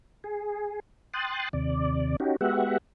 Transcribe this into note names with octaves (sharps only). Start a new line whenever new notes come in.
G#4
G5 C6 D#6 F#6 A6
D#2 C3 D5
C#4 D#4 F#4 G4
G#3 B3 F#4 G4 E5 F#5